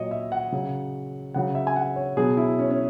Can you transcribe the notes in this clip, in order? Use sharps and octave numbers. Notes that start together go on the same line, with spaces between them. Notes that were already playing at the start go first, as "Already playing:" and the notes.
Already playing: A#2 F#3 C#5 D#5
E5
F#5
C#3 F#3
C#3 F#3 F#5
E5
G#5
F#5
C#5
B2 F#3 G#4
E4
C#4
C#4